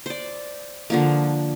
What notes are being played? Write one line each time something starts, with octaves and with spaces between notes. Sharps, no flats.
C5 D5
D3 F3 A#3